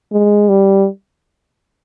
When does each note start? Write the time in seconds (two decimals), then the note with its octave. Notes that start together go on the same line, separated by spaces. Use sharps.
0.12 G#3
0.49 G3